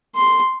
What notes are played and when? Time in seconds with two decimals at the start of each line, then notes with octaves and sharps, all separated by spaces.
0.15 C6